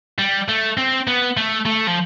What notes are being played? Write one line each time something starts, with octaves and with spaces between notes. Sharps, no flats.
G3
A3
C4
B3
A3
A3
F3